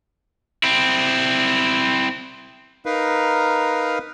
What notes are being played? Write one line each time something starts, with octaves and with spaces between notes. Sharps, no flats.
C4 E4
D#4 A#4 B4 F5